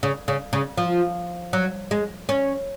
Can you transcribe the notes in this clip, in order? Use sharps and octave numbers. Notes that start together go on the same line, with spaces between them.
C#3
C#3
C#3
F3
F#3
G#3
C#4